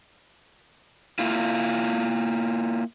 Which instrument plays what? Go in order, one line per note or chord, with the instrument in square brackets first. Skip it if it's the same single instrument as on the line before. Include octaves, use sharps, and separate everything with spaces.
[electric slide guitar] A#3 E4 F4